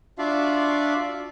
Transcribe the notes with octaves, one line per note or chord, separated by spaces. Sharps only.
D4 F4 F#4 D5 E5 F5